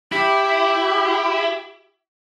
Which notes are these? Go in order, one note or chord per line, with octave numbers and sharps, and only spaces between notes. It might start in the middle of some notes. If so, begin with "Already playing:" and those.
E4 G4